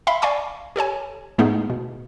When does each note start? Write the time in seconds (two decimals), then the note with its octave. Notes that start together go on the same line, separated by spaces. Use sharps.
0.07 E5 F5 B5 C6
0.22 D5 F5 G#5 C#6 D6
0.76 G4 A4 C#5 G#5
1.38 A2 G#3 A3 B3 D#4 G#4
1.70 B2